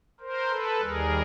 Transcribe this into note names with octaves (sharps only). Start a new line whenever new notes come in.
A#4 C5
A4 B4
D#2 D#3 G3 G#4 A#4